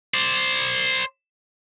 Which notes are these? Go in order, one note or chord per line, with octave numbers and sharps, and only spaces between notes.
C5 D5